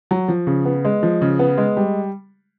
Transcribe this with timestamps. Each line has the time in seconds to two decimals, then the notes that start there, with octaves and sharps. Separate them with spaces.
0.11 F#3
0.28 F3
0.47 C#3
0.65 B3
0.85 G#3
1.03 F3
1.22 C#3
1.39 B3
1.58 G#3
1.77 G3